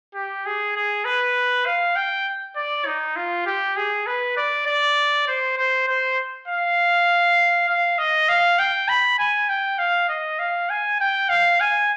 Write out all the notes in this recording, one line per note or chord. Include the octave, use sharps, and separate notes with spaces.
G4
G#4
G#4
B4
F5
G5
D5
D#4
F4
G4
G#4
B4
D5
D5
C5
C5
C5
F5
F5
D#5
F5
G5
B5
G#5
G5
F5
D#5
F5
G#5
G5
F5
G#5